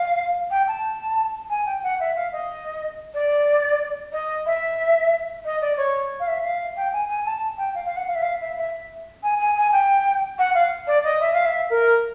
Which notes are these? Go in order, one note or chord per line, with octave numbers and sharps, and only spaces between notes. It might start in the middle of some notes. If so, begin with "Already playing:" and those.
Already playing: F5
G5
A5
G#5
G5
F#5
E5
F5
D#5
D5
D#5
E5
D#5
D5
C#5
F5
E5
F5
G5
G#5
G#5
A5
G5
F5
F5
F#5
F5
E5
F5
E5
E5
G#5
G#5
G#5
G5
F#5
F5
D5
D#5
E5
F5
E5
A#4